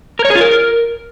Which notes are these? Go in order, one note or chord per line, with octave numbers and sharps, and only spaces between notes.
A#4
C#5
G#4
F4
A#4